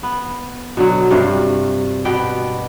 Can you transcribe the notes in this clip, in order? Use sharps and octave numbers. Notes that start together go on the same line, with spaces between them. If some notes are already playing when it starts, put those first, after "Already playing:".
B3
B2 D3 F#3
G2 C3 F4 F#4
B2 B3 G4 G5